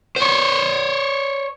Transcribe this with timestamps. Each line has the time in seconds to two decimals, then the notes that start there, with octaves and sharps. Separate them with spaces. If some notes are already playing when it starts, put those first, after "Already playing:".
0.16 C5 C#5